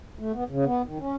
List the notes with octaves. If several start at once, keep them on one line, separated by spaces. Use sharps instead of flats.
A3
B3
C#3
B3
D#3
C#4